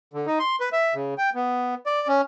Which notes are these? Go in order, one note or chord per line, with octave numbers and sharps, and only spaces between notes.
D3
D#4
C6
B4
E5
C#3
G5
B3
D5
C#4